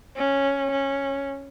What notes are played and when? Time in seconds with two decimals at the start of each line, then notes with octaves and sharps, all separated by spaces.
0.17 C#4
0.72 C#4